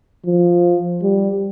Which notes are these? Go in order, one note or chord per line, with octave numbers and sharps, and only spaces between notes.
F3
G3